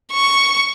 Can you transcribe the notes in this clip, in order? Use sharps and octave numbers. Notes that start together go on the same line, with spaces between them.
C#6